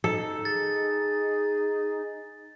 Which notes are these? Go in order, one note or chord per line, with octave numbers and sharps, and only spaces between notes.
D#4 A4
G#4 A6